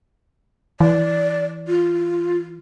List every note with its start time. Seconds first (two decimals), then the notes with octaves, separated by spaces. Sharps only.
0.80 E3 D5
1.68 F4